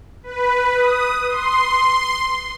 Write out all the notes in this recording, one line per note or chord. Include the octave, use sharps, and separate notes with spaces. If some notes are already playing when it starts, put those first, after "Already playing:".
B4
D#6
C6